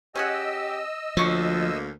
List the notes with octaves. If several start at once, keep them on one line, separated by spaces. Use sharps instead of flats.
C#4 G4 G#4 D#5 F#5 E6
D2 F3 A#3 C#5 C#6